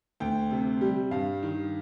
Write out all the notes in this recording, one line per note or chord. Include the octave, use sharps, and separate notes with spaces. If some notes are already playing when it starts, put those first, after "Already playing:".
D2 G5
C3
G3
G2 F5
D#3